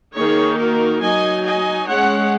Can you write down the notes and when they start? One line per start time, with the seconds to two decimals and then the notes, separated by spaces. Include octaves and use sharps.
0.15 D#3 A#3 D#4 G#4 C#5
0.58 F#4 A#4
1.01 F#3 D#4 D#5 G#5
1.45 D#5 G#5
1.87 G#3 C#4 C#5 F#5